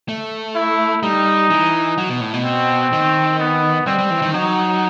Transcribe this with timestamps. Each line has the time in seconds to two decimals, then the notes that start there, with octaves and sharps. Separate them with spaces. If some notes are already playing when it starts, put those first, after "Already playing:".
0.09 A3
0.55 E4
1.03 G3 D#4
1.50 E3
1.98 F#3
2.09 B2
2.21 A2
2.33 B2
2.45 C4
2.93 D#3
3.39 B3
3.87 G3 C4
3.98 G3
4.10 E3
4.22 D#3
4.34 F#3 D#4